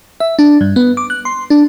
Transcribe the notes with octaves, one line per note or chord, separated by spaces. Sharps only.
E5
D4
G2
B3
D6
F#6
C6
D4